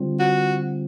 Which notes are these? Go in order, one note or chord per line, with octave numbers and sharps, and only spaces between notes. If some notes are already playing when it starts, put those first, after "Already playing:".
Already playing: D3 G3 C4 F4
F#4